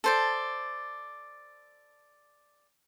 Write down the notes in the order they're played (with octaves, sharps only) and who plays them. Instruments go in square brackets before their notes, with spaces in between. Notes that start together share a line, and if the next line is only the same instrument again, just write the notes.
[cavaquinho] A4 C5 D5